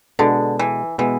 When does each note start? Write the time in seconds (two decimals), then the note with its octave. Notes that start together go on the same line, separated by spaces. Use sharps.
0.19 B2 D3 G#3 B3
0.59 E3
0.98 B2 E3 G#3 B3